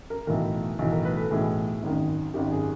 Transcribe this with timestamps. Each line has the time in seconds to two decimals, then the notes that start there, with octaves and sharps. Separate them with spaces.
0.10 A#4
0.27 B1 A2 E3 A#4
0.79 B1 A2 E3
0.92 A#4
1.05 B4
1.17 A4
1.30 B1 A2 E3 G#4
1.82 G#1 F#2 D#3
2.34 G#1 F#2 D#3 G4
2.51 G#4